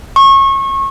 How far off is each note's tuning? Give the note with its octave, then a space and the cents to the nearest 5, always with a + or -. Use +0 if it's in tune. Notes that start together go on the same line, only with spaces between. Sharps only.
C#6 -30